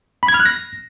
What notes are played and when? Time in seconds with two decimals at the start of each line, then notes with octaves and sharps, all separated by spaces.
0.23 B5
0.28 G#6
0.34 F6
0.40 F#6
0.45 A#6